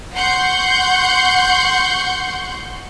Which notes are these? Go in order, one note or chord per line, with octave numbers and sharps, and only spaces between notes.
F#5 C6 C#6 G6